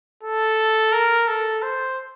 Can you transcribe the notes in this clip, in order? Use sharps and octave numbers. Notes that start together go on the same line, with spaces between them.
A4
A#4
A4
C5